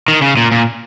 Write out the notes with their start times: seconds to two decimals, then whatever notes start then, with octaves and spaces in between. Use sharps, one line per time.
0.08 D#3
0.22 C#3
0.37 A#2
0.52 A#2